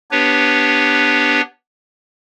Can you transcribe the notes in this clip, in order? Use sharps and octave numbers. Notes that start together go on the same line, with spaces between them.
B3 D4 G4 B4 C#5